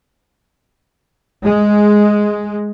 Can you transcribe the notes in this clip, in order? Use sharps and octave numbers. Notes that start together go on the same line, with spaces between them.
G#3